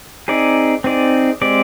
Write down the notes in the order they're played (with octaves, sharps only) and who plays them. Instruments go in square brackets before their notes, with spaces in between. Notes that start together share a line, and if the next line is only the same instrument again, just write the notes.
[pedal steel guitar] C4 D#4 G#4 D5
C4 D#4 G#4 D5
G#3 C4 G4 D5